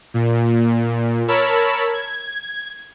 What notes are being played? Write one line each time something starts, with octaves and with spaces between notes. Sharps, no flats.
A#2
A#4 C#5 A5 B5 E6
G#6